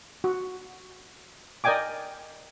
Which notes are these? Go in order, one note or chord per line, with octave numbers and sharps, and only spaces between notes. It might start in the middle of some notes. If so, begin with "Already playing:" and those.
F#4
A#4 D5 D#5 G5 G#5 D6